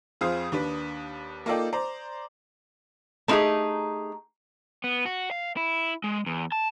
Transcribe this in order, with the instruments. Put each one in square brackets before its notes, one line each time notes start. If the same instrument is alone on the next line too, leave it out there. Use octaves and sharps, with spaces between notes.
[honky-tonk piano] F2 G#4 C5 F5 D#6
D#2 D4 B4
A#3 D#4 F4 A4 D5 G5
C5 D5 A#5
[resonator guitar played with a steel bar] A3 C4 D#4 F4 G4 G#4
[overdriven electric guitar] B3
F#4
F5
E4
G#3
E2
A5